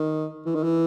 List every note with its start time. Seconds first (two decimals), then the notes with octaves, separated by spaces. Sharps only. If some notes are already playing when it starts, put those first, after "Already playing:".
Already playing: D#3
0.46 E3
0.55 D#3
0.63 E3